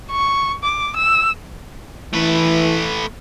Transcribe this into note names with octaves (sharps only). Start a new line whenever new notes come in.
C#6
D6
E6
E3 A3 B4